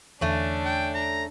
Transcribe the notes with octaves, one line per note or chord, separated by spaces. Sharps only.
E2 D3 E3 A3 C#4 D4
G5
A#5